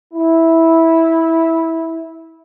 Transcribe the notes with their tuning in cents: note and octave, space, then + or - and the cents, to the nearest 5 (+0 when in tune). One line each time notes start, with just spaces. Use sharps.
E4 -10